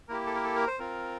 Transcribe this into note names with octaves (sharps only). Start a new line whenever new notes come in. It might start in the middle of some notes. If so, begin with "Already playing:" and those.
A#3 E4 G4 A#4
A4
A#4
A4
A#4
C5
C4 F4 A#4